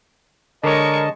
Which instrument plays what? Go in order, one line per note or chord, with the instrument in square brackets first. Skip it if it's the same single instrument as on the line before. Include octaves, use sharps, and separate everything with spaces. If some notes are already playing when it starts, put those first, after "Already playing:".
[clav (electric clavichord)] D3 C#5 [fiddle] G#3 C#6 [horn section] A#4 [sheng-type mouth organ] D#5 A5